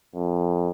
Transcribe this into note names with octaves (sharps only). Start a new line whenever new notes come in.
F2